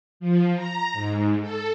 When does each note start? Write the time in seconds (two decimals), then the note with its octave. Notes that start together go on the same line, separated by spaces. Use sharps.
0.20 F3
0.56 A#5
0.93 G#2
1.41 A4